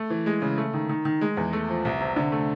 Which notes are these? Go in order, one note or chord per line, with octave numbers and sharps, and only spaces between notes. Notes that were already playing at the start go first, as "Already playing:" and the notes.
Already playing: A3
E3
G#3
C#3
A3
D#3
D#3
D#3
G#3
E2
A3
F3
C2
C3
D3
A3